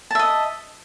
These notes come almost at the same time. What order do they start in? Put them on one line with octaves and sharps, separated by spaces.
A5 E5 D#5